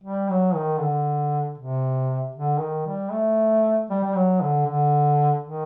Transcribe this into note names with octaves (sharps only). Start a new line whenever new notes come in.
G3
F#3
D#3
D3
C3
D3
D#3
G3
A3
G3
G3
F#3
D3
D3
D#3